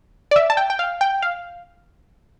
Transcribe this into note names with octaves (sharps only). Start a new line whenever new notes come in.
D5
E5
A5
G5
G5
F5
G5
F5